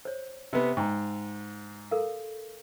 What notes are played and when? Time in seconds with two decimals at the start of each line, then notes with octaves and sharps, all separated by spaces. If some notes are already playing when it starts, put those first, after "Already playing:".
0.05 C5 C#5
0.53 C3 B3
0.77 G#2 G5 A#5
1.91 A4 A#4 F5